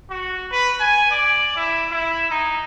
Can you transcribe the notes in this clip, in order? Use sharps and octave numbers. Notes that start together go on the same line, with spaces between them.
F#4
B4
G#5
D5
E4
E4
D#4